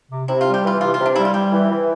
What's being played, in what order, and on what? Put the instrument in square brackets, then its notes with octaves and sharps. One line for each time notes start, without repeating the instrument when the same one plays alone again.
[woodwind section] C3
[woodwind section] C3 [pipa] E4
[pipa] F4
[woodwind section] G3
[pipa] G4
[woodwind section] E3 [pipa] F4
[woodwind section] C3 [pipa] F4
[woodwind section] C3 [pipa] F4
[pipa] D4
[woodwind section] G3 [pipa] E4
[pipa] F4
[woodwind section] G3 [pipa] G4
[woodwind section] E3
E3